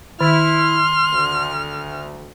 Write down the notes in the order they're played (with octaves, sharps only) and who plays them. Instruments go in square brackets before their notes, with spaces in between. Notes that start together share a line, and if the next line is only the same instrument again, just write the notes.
[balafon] D#3 [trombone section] E4 [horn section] C6 [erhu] F6
[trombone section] D2